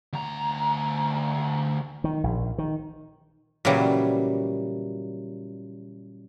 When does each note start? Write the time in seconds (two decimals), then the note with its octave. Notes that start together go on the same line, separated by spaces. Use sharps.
0.13 D2 A#5
2.04 D#3
2.24 A#1
2.58 D#3
3.65 A#2 C#3 E3 F#3 G3